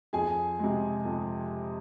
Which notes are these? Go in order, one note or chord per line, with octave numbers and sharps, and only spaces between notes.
F2 G#4 G#5
C3 G#3
F2